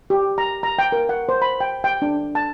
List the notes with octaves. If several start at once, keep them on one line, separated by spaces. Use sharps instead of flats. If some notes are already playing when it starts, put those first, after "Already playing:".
G4
A#5
A#5
G5
A#4
F#5
C5
B5
G5
G5
D4
A5